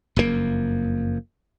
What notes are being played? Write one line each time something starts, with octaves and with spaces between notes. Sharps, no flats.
F#1 F2 B2 A#3